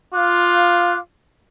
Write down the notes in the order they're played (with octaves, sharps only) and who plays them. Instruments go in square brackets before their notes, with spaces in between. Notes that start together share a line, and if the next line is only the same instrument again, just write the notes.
[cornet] F4 [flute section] F5 D6 F#6